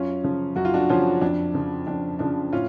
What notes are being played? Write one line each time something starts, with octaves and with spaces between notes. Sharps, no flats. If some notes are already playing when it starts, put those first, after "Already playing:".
Already playing: F#2 C#4 F4
C#3 F3
F#2 F#4
F4
D4 F#4
C#3 F3 C#4 F4
F2 D4
C#3 F3
F2 D4
C#3 F3 D4
A2 C#4 F4